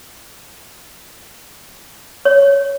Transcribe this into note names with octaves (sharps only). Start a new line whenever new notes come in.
C#5